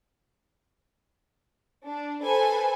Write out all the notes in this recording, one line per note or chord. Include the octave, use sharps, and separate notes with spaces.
D4
A4 B4 C5 G#5